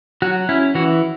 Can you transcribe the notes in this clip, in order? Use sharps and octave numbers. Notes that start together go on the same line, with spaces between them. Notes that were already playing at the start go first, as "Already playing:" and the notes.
F#3 F#4
C#4 E4
E3 F#4